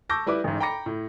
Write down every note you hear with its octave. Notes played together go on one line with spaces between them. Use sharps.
A5 C#6 D6 E6 G6 A#6
G3 E4 B4 D6
A1 G#2
G5 A#5 B5 D6 A#6 C#7
A2